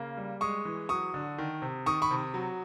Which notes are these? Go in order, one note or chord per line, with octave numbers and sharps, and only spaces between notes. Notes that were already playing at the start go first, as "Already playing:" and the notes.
Already playing: C#3 A#3
G3
G#3 C#6 D#6
E3
F#3 C#6 D#6
D3
D#3
C3
D#3 C#6 D#6
B5 C#6
C3
F#3